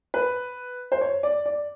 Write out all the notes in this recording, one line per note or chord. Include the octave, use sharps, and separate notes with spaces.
B4
C5
C#5
D5
D5